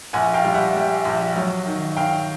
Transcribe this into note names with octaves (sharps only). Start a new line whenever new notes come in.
A#1 F#5 G#5
F5 G5
G3
E5 F#5
G3
A#1
F#3
D#3
D#3 F5 G5